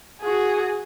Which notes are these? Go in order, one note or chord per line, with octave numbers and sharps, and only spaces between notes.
F#4 G#4